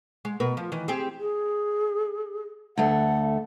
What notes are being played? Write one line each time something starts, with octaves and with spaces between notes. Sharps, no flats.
G#3
B2 A#4 B4
F3
D#3 E3
C4 G4 G#4
G#4
D2 A3 F#5